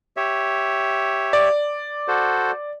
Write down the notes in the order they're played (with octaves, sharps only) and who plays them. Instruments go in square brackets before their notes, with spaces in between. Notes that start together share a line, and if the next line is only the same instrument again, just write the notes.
[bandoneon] G4 C#5 E5
[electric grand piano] D5
[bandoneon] F#4 A4 C5